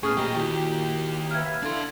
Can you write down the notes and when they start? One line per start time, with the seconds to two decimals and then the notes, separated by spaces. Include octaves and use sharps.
0.03 A2 B3 C#4 G#4 C#6 D#6 F6
0.17 F2 A#2 G4 D#5 G5 A#5
0.35 D#2 E4 F#4 G4
1.31 B4 E5 F5 F6 G#6
1.63 D4 E4 A4 F5 C6